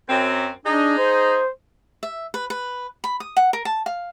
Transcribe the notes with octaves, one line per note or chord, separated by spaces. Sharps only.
F#2 C4
D4 D#4 G#4
C5
E5
B4
B4
B5
D#6
F#5
A#4
A5
F5